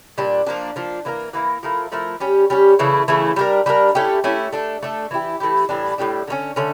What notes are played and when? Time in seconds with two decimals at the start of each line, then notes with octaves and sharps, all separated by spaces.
0.18 A#2 G3 D4
0.47 F3 A#3 D4
0.76 F3 A#3 D4
1.05 E3 A#3 E4 A#4
1.33 E3 A#3 E4 A#4
1.63 F3 A3 E4 A#4
1.92 F3 A3 E4 A#4
2.20 G3 C#4 G4
2.50 G3 C#4 G4
2.79 C#3 E3 A3 E4
3.08 C#3 E3 A3 E4
3.36 G3 D4 G4 A#4
3.66 G3 D4 G4 A#4
3.95 A3 C#4 E4 G4
4.24 A3 C#4 E4 G4
4.53 A3 D4 A4
4.83 A3 D4 A4
5.11 E3 A3 E4 G4
5.40 E3 A3 E4 G4
5.69 A2 E3 G3 D4
5.98 A2 E3 G3 D4
6.28 D3 A3 C#4
6.56 D3 A3 C#4